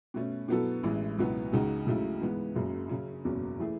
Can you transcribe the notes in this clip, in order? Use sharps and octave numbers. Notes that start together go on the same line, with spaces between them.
B2 A3 C#4
B2 F#3 B3 E4 A4
A1 A2 E3 G#3
C#2 B2 F#3 B3 E4
C#2 C#3 G#3 D#4 F#4
C#2 C#3 F#3 A3 E4
G#2 E3 G#3 B3
F#1 F#2 C#3 F#3
C#3 F#3 C#4
F#1 E2 B2 F#3 C#4
E3 A3 E4 G#4